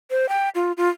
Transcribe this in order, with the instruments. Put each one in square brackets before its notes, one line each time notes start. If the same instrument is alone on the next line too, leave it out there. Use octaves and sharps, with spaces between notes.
[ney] C5
G5
F4
F4